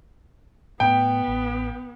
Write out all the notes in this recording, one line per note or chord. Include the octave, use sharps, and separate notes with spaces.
A2 A3 B3 G5
A1